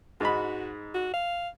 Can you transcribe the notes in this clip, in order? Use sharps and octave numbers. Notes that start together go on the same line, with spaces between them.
G#2 D#4 F#4 B5
F#4
F5